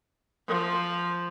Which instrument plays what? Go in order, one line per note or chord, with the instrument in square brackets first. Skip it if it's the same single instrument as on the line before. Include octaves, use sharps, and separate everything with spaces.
[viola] F3